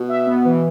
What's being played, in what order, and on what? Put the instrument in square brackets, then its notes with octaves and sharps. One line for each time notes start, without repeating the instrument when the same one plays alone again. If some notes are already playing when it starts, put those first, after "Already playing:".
Already playing: [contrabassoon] B2
[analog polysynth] E5
B3
E3